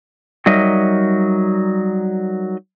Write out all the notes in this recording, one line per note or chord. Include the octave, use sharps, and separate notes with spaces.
F#3 G3 D#4 A#4 D#5 E5